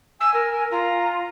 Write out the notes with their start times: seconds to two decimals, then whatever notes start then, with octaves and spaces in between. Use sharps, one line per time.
0.21 G#5 E6
0.34 A#4
0.71 F4 A#5